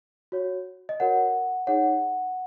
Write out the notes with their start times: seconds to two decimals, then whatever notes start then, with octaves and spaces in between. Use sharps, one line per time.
0.32 F#4 C#5
0.89 D#5
1.00 F#4 A#4 C#5 F#5
1.67 D#4 G#4 C#5 F#5